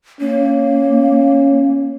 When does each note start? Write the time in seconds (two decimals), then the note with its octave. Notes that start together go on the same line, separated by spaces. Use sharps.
0.21 A#3 C#4